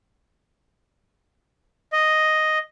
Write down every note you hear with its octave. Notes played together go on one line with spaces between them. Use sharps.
D#5